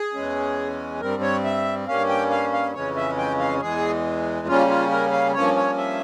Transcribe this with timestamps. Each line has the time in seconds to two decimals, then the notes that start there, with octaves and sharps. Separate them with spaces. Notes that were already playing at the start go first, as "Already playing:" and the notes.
Already playing: G#4
0.14 E2 E3 G#3 C#4
1.01 G2 G3 C4 A#4
1.22 C#5
1.45 E5
1.87 G2 G3 A#3 C#4 F5
2.09 G5
2.30 F5
2.53 F5
2.74 F2 C#3 E3 G#3 C#4 C#5
2.96 E5
3.18 G5
3.39 F5
3.61 E2 E3 G#3 G#4
4.47 C#3 G3 A#3 C#4 F4
4.69 F4
4.91 A#4
5.12 F5
5.34 G2 F3 A#3 C#4 C#5
5.56 C#5
5.78 E5